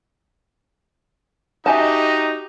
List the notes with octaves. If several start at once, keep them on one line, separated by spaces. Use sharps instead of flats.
D#4 F#4 G4 D#5 E5 G#5 A5